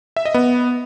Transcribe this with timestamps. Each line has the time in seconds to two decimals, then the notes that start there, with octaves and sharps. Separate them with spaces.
0.16 E5
0.25 D#5
0.34 B3